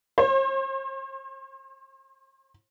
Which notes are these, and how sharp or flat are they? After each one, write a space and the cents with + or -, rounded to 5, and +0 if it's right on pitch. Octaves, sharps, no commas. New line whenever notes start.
C5 +40